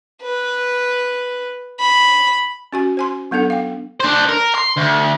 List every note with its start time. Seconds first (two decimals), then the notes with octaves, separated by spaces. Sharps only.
0.22 B4
1.80 B5
2.73 C#4 F#4 G#5
2.97 C5 G#5 C6
3.31 F#3 B3 D4 A4 F#5
3.50 F5 G5
4.00 D4 C5
4.29 A#4
4.55 C6
4.77 D2